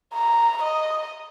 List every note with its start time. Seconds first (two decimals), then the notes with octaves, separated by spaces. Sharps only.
0.14 A#5
0.63 D#5